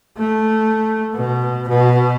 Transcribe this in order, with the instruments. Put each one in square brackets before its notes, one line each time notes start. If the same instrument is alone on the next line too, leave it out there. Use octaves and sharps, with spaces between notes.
[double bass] A3
B2
B2